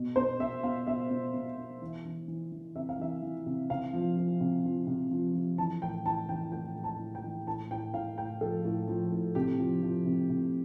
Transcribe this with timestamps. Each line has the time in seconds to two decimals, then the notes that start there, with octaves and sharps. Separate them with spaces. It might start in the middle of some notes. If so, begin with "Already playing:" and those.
Already playing: B2
0.16 B2 C5
0.40 B2 E5
0.63 B2 F5
0.87 B2 E5
1.10 B2
1.34 B2
1.58 B2
1.82 E3
2.05 E3
2.28 E3
2.52 E3
2.76 C3 E5
2.89 F5
2.99 E3 E5
3.22 E3
3.46 C3
3.70 C3 F5
3.93 F3
4.17 F3
4.40 C3
4.64 F3
4.87 C3
5.11 F3
5.35 F3
5.58 E3 A5
5.82 A2 G5
6.06 E3 A5
6.29 E3 G5
6.52 A2 G5
6.76 A2
6.84 A5
6.99 A2
7.15 G5
7.23 E3
7.47 A2 A5
7.71 A2 G5
7.94 A2 F5
8.18 A2 G5
8.41 F3 A4
8.65 A2
8.88 F3
9.12 A2
9.35 C3 G4
9.58 F3
9.82 F3
10.06 C3
10.29 C3